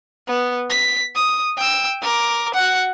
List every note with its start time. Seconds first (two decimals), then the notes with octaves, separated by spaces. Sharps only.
0.28 B3
0.70 B6
1.15 D#6
1.58 G5 E6
2.02 A#4 D6
2.54 F#4 F#5